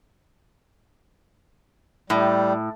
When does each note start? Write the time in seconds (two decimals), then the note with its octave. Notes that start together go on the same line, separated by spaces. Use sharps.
2.10 A2 G3